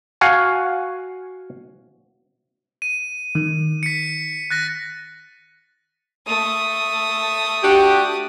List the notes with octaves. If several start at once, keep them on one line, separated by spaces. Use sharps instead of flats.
F#4 F5 F#5 G#5
D#7
D#3
B6 C#7
F#6 A6 A#6
A3 D#6
D4 F#4 G4